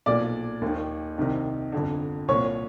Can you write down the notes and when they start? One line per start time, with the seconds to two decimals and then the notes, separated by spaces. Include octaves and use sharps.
0.06 B1 A#2 D5 D6
0.62 D#2 D#3
1.18 C2 C3 D#3
1.72 G1 F2 D3
2.28 C2 A#2 C#5 C#6